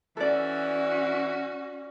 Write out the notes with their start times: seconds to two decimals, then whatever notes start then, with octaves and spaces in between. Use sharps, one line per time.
0.17 E3 C#4 F#4 A4 D5